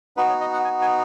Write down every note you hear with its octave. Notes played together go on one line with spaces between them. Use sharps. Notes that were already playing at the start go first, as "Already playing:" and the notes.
B3 D#4 F#4 B4
C#5
D#5
F#5
G#5
G#5